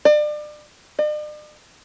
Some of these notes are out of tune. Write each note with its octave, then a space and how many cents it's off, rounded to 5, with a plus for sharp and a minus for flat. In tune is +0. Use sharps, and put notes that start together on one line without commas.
D5 +30
D5 +45